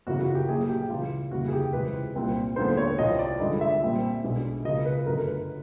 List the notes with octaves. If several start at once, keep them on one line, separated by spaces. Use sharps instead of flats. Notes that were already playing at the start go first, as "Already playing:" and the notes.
G1 F#2 C#3 E3 F#4
F#4
G4
A#1 A#2 F#3 G#4
G4
C#2 C#3 E3 F4
F1 D#2 C#3 E3 G3 F#4
G#4
G4
C#2 C3 E3 G#3 B4
C2 A#2 G3 C4
D#2 D3 F3 G#3 B3 C5
C#5
C2 C3 F3 D#5
D5
G2 D3 F3 G#3 D#5
E5
A#1 A#2 G3 C4
B1 B2 G#3 B3 D4
C#2 C#3 F3 A#3 D#5
B4
G1 F#2 D3 F#3 A3 A#4
B4